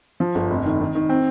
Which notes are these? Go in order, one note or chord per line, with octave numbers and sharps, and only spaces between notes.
F3
G1
F1
D#3
D#3
D#3
C4